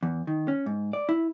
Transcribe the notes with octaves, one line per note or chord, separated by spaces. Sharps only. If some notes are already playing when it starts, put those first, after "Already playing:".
E2
D#3
C#4
G#2
D5
E4